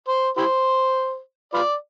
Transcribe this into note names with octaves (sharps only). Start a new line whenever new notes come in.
C5
E4 G4 C5
F4 B4 D5